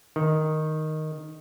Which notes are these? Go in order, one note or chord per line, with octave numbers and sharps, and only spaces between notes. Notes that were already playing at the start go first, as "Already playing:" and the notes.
D#3